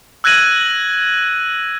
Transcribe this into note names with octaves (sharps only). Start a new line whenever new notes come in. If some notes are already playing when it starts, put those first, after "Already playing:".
E6 F#6 G#6 A#6 D#7 F#7